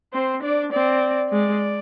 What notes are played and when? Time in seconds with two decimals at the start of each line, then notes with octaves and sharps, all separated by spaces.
0.13 C4 C5
0.43 D4 D5
0.72 C4 D5
1.32 G#3 D5